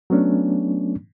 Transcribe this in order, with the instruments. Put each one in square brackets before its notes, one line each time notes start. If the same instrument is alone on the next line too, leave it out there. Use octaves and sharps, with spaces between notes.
[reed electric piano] F#3 A3 B3 C#4 D4